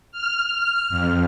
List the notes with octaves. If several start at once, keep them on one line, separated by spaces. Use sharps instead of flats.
F6
F2